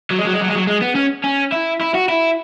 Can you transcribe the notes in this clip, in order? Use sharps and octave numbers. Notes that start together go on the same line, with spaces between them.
F#3
G#3
F#3
G#3
F#3
G#3
F#3
G#3
B3
C#4
C#4
E4
E4
F#4
E4